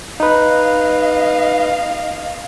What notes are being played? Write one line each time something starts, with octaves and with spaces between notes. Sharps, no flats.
D#4 B4 D#5 F5